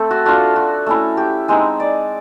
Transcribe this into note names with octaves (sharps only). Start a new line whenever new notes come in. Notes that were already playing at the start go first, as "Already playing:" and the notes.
Already playing: A3 C4 A4
F#4
A3 D4 F4 F#4
F#4
A3 C#4 E4
G4
G#3 C4 D#4 G#4
D5